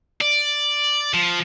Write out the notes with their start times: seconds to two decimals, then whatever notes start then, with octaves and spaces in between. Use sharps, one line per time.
0.21 D5
1.14 F3